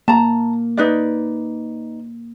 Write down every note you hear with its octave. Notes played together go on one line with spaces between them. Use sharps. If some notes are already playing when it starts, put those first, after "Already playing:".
A#3 A5 A#5
D#4 B4 D5